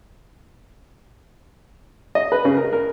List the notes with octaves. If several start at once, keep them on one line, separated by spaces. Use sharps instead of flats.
D#5
B4
C#3
A#4
A#4